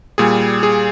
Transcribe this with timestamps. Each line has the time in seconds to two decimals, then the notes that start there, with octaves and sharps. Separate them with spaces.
0.18 A#2 G3 G#4
0.63 G#4